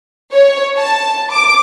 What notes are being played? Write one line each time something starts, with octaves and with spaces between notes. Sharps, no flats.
C#5
A5
D6